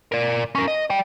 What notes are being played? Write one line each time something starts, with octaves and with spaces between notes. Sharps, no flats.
A#4 D5
C#4 A#4
D#5
D5 G5